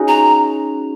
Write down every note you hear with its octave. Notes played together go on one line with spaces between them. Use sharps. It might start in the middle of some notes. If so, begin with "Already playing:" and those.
Already playing: C#4 D#4 F#4 G#4
A#5